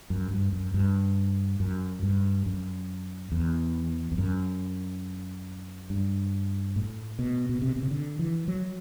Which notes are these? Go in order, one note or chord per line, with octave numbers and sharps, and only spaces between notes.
F#2
G2
F#2
G2
F#2
G2
F#2
E2
E2
F#2
G2
A2
B2
B2
C3
B2
C3
D3
E3
F#3